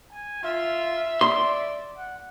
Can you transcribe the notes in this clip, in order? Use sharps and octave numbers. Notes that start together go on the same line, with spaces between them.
G#5
F4 E5
D5 C6
F#5